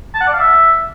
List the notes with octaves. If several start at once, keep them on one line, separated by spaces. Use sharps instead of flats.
A5
F#5
D5
F5
E5